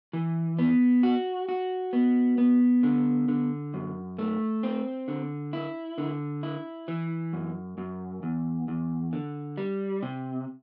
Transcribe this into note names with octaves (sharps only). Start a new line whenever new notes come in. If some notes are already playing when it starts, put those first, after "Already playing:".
E3
B3
F#4
F#4
B3
B3
D3
D3
F#2
A3
C4
D3
E4
D3
E4
E3
F#2
F#2
E2
E2
D3
G3
C3